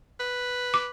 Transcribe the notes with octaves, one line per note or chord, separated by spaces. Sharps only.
B4
D6